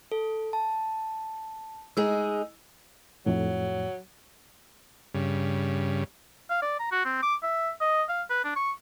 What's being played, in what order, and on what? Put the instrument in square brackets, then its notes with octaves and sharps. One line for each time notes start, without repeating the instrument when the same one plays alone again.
[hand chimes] A4
A5
[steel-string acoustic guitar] G#3 D#4 G#4 [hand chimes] E6
[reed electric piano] F2 A2 [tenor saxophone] F#3
[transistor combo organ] G2 C#3
[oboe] F5
D5
A#5
F#4
C4
D6
E5
D#5
F5
B4
D4
C#6